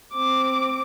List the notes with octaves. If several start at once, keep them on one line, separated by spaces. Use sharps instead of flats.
C4 D6